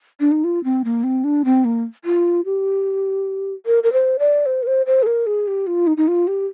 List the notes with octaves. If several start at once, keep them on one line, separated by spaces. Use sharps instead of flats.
D4
D#4
F4
C4
A#3
C4
D4
C4
A#3
F4
G4
A#4
A#4
C5
D5
C5
A#4
C5
C5
G#4
A#4
G#4
G4
F4
D#4
D#4
F4
G4